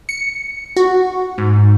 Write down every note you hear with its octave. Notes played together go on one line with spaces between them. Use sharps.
C#7
F#4
G#2